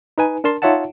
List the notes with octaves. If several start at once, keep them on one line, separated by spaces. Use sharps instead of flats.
D#4 B4 G#5
D4 A#4 A5 C6
D#4 F4 C#5 E5 F#5 A5